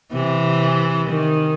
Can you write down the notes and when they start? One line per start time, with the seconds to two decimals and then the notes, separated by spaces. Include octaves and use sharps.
0.13 C3 E3
1.09 D#3